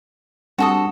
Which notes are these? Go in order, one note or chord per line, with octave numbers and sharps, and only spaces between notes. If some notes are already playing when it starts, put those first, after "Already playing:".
G3 C4 D4 F#4 A4 D#6